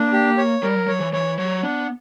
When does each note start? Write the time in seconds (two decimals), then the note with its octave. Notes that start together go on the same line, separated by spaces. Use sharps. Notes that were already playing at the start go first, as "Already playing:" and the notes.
Already playing: A#3 D4
0.13 G4
0.38 C#5
0.63 G3 A#4
0.75 F#3
0.87 F#3 C#5
1.00 E3
1.13 E3 C#5
1.38 F#3 C#5
1.63 B3 D4